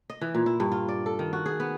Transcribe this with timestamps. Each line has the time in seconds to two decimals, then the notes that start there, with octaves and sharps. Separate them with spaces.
0.10 D#5
0.21 E3
0.34 A#2
0.46 E4
0.60 G2
0.72 F4
0.88 D5
1.06 A4
1.19 D#3
1.33 F#4
1.46 G#4
1.60 B3